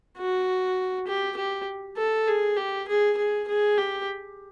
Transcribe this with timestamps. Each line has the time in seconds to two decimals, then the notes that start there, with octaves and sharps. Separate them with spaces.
0.17 F#4
1.07 G4
1.37 G4
1.97 A4
2.28 G#4
2.57 G4
2.88 G#4
3.17 G#4
3.48 G#4
3.78 G4